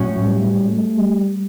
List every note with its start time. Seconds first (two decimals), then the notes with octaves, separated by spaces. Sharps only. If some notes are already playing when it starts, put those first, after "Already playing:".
Already playing: A2 F#3 C#4
0.21 G3
0.68 A3
0.98 G3